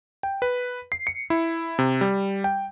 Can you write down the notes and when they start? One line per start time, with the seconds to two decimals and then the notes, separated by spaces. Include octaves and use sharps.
0.23 G5
0.42 B4
0.92 C7
1.07 C#7
1.30 E4
1.79 C3
2.01 G3
2.44 G5